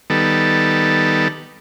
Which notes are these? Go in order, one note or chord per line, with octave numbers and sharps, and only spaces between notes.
D#3 G3 B3 A4